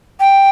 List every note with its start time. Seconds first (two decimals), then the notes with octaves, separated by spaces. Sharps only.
0.20 G5